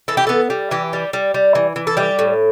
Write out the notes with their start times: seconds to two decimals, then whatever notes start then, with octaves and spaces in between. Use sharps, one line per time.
0.08 E3 A4
0.17 G4
0.27 B3 A4
0.50 G3
0.71 E3 G4
0.93 G3
1.13 G3
1.34 G3
1.55 E3
1.76 E3
1.87 A4
1.97 G3 G4
2.19 A2